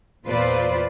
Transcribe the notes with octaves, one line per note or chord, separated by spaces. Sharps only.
E2 A#2 F4 B4 C5 D5